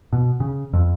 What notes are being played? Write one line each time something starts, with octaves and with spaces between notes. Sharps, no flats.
B2
C#3
F2